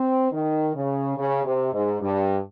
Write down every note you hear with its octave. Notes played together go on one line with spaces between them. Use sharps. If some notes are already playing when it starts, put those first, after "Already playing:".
Already playing: C4
D#3
C#3
C#3
C3
G#2
G2